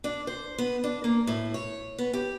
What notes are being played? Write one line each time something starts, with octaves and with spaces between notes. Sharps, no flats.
D4
C5
B3
D4
A#3
A2
C#5
B3
G4